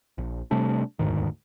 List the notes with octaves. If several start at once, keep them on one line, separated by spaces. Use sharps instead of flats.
A#1
C3 G3 A3 D4
E1 D2 G#2 D#3